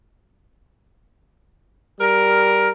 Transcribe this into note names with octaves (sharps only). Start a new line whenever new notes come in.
G3 A#4